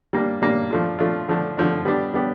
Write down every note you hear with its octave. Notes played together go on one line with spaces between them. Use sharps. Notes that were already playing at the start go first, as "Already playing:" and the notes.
G3 A#3 D4
G3 A#3 D4
F3 A3 D4 F4
F3 A3 D4 F4
D3 F3 A3 D4
D3 F3 A3 D4
G3 B3 D4 G4
G3 B3 D4 G4